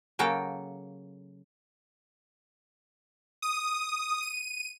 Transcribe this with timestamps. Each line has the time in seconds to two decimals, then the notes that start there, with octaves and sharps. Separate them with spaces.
0.19 C#3 F#3 A#3 A4 G5 A#5
3.42 D#6
4.22 D#7